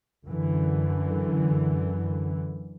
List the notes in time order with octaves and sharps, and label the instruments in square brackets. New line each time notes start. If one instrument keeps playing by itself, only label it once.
[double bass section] F#2 D3 E3